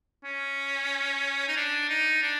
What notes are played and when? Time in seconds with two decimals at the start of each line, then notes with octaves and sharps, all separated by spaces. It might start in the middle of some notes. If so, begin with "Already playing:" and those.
0.24 C#4
1.48 D#4
1.56 D4
1.89 D#4
2.22 D4